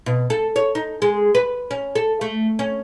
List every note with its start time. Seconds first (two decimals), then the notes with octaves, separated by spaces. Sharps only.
0.06 B2
0.30 A4
0.56 C#5
0.75 D#4
1.02 G#3
1.35 B4
1.71 C#4
1.95 A4
2.21 A3
2.59 C#4